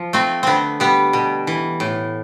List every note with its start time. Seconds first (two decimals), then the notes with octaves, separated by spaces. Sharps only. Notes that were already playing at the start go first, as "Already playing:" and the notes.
Already playing: F3
0.13 A3 C4
0.43 D3 B3 C4
0.80 G3 B3
1.13 B2
1.47 E3
1.80 A2